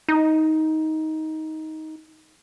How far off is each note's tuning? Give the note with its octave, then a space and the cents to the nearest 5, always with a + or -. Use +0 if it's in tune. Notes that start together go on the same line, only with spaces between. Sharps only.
D#4 +15